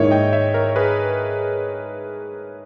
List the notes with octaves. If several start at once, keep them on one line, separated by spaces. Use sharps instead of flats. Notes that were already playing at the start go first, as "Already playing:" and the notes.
Already playing: G#2 D#3 A#3 E4 C#5 E5
D#5 G5
C#5 E5
A#4 C#5
C#5
G#4 B4